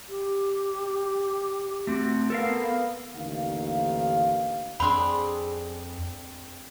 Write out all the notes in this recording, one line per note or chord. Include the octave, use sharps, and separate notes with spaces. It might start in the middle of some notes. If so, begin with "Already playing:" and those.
G4
A3 C4 F#4
B3 A4 A#4 F5
A1 D#2 D3 D#3 F5
F2 C4 D4 G#4 B5 C6